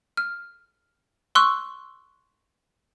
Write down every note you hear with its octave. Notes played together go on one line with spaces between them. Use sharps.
F6
C6 C#6 E6 F#6